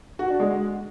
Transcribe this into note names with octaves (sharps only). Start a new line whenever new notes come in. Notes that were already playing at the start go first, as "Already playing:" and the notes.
F#4
D4
G#3